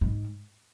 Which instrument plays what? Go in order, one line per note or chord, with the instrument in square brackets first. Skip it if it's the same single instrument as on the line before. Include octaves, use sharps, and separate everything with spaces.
[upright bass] G#2